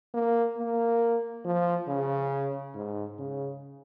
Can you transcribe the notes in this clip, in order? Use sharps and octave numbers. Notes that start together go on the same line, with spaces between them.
A#3
A#3
F3
C#3
G#2
C#3